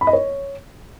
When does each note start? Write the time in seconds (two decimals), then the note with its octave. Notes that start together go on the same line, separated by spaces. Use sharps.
0.01 B5
0.07 D#5
0.13 C#5